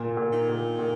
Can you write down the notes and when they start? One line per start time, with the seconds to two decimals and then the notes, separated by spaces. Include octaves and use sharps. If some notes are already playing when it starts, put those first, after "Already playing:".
Already playing: A#2
0.17 A#2
0.32 D#3
0.49 A#2
0.79 A#2